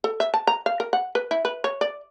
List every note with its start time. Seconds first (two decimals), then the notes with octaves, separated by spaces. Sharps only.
0.04 A4
0.20 E5
0.34 A5
0.47 A#5
0.66 F5
0.80 A#4
0.93 F#5
1.15 B4
1.31 E4
1.45 B4
1.64 C#5
1.81 D5